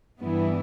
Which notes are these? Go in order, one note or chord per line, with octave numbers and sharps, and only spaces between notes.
G2 E3 G3 B3 E4